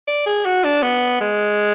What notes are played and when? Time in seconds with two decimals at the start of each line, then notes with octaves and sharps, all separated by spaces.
0.07 D5
0.26 G#4
0.45 F#4
0.64 D4
0.83 B3
1.21 G#3